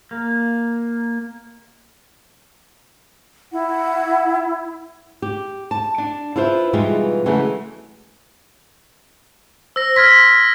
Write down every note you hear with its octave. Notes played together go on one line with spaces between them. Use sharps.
A#3
E4 F#5
G4
A5
D4
E4 F4 B4 C5 E5
B2 E3 G3 G#3 D#4 F4
C#3 E3 F#3 G#3 A3
C5 E6 A#6
C6 F6 G#6 A#6 B6